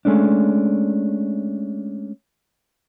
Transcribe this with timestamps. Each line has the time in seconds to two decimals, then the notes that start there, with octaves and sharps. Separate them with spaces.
0.05 G#3 A3 C#4 D4